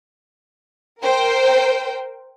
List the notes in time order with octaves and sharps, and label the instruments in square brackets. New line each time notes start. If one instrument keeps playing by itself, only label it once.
[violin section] A#4 C5 G5